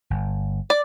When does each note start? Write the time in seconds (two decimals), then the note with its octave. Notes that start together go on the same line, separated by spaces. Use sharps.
0.10 G1
0.70 D5